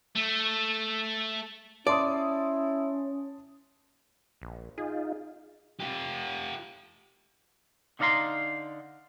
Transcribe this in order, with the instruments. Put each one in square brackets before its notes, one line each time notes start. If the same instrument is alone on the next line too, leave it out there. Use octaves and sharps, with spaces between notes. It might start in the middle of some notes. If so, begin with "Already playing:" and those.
[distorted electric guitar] A3
[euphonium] C#4 [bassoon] E4 [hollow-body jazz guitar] D5 [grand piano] A5 C6 D#6
[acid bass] A#1
[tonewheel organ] D#4 F4 [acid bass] G#4
[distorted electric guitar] F4 G4
[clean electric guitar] D3 D#4 D5 F5 A#5 C6